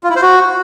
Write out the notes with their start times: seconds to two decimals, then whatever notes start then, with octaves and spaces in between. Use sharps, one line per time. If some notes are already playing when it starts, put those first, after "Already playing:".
0.04 F4
0.10 E4
0.16 C5
0.22 F#4